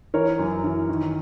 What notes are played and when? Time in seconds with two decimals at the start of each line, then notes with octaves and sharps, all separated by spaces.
0.14 E3 A#4 C#5
0.39 F#2
0.64 E3
0.89 D#3